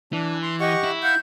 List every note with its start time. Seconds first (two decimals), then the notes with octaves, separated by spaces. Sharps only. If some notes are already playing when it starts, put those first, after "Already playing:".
0.13 E3 D4
0.42 C6
0.60 G4 D#5 F#5 C#6
0.84 E4
1.03 F5 F#5 G6